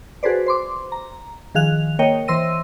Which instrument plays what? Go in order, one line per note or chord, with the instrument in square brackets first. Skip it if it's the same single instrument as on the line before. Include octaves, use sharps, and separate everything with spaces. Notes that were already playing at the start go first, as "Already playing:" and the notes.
[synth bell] F#4 G#4 A4 B4 C5 D5
C5 C6 D6
A#5
D#3 F3 G#4 F5 F#6 F7
A#3 A#4 C#5 D#5 G5
E3 C5 C6 E6 A#6 D#7